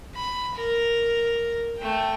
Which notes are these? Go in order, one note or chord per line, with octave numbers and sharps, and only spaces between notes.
B5
A#4
A3 G5